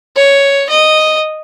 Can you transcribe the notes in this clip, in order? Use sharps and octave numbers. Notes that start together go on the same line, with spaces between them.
C#5
D#5